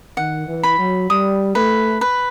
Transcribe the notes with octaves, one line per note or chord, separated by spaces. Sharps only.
D#3 F#5
E3
B5
F#3
G3 D#6
A3 B4
B4